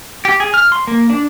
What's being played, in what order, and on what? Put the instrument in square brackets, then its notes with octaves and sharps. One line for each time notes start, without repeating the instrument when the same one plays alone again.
[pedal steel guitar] G4
G#4
F6
C6
A#3
D4